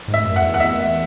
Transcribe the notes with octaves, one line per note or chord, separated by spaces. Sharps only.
G#2
E5
F#2
F#5
E2
F#5
E2 E5